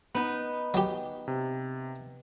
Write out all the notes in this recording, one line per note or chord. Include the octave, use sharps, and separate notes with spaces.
B3 D#4
F#3 G4
C3